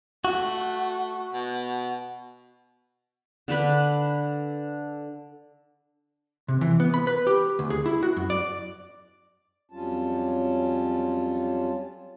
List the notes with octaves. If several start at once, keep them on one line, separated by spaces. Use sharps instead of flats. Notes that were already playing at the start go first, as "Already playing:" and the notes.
A3 F#4
B2
D3 D4 B4 B5
C3
E3
B3
B5
B4
G4
D2
G#4
E4
F#4
F#2
D5
F2 F#3 G3 C#4 F4 A5